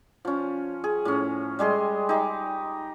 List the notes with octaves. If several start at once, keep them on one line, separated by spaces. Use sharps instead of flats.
F3 C#4
G#4
A2 C#4
G3 G#3 G#4 C6
D#4 G4